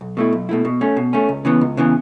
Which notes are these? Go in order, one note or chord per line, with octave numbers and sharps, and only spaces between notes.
B1
B2 A3 E4
B1
B2 A3 E4
B2
A3 C#4
B2
A3 C#4
C#2
C#3 E3 B3
C#2
C#3 E3 B3